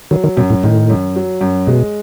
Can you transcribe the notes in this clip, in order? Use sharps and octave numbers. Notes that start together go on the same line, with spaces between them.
D#3 F#3
D#3
F#2 B2
A2
A2 D#3
F#2
F#3
F#2
B2 G#3